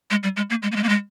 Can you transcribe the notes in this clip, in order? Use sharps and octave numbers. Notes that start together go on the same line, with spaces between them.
G#3
G3
G#3
A#3
G#3
A#3
G#3
A#3
G#3